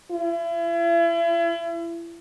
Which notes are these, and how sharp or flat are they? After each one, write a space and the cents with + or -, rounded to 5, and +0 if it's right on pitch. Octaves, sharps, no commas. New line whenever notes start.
E4 +40